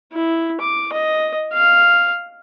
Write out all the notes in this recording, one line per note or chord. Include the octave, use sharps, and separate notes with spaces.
E4
D6
D#5
F5